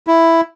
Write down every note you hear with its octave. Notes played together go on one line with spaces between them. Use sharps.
E4